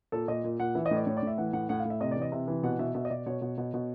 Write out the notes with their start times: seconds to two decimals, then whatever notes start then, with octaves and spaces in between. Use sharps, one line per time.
0.12 A#2 A4
0.28 A#2 D#5
0.44 A#2
0.60 A#2 F#5
0.75 E3 E5
0.86 D#5
0.91 A2 D5
1.06 A2 C#5
1.17 D5
1.22 A2 E5
1.38 E3 F#5
1.53 A2 F#5
1.69 A2 F#5
1.80 F5
1.85 A2
1.90 E5
2.00 C3 D#5
2.11 E3 D5
2.22 D#5
2.32 C3 E5
2.48 E3
2.63 B2 F#5
2.79 B2 E5
2.94 B2 E5
3.05 D#5
3.10 B2 D5
3.26 B2 C#5
3.42 B2
3.58 B2
3.74 B2